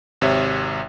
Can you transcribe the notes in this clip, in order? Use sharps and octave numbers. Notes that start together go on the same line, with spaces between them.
G#1 C3 C#5 E5